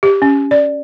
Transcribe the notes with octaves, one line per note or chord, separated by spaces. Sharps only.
G4
C#4
D5